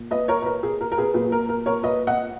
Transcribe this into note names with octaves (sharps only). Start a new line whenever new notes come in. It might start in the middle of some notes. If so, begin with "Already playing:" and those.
Already playing: A#2
B4 D#5
A#4 C#5
B4
A#4
G#4
A#4
A#4
G#4 B4
A#2 F#3 G#4 B4
A#4
A#4
A#4 C#5
B4 D#5
D#5 F#5